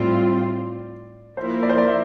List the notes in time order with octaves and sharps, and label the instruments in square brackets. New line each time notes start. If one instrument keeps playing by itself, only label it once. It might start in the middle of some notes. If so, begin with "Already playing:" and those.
Already playing: [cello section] A2 G3 C4 F4 [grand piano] D5
[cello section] F3 A#3 E4 A#4 [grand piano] C5
[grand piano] D5
C5
D5
E5